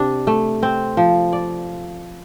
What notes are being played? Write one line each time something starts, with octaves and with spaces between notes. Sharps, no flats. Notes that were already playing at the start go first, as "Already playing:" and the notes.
Already playing: C3 D4
A3
C4
F3
D5